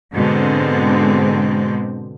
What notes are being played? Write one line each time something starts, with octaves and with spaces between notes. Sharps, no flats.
G#2 B2 D3 G#3 C4